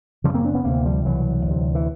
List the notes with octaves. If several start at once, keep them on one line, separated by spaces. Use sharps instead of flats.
F#2 C#3 F3 G3
A#3 C4
C4 D4
B3 C#4
D2 C3 A#3 C4
F3 G3
C2 B2 E3 F#3
D2 C3
E3